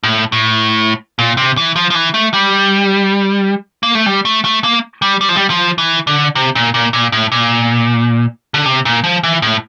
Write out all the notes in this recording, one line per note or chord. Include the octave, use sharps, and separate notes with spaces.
A2
A2
A#2
C3
E3
F3
F3
E3
A3
G3
A#3
A3
G3
A3
A3
A#3
G3
G3
F3
G3
F3
E3
D3
C3
A#2
A#2
A#2
A2
A#2
D3
C3
A#2
F3
E3
A2